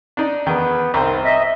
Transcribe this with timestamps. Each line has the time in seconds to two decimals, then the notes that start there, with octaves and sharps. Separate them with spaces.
0.17 D4 D#4
0.46 E2 D#3 B3
0.94 C2 D#3 C4 C5
1.24 D#5 E5